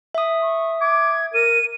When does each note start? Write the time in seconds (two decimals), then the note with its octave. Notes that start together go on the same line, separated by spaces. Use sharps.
0.15 E5 D#6
0.42 C#6
0.81 D6 G#6
1.34 A#4 D#7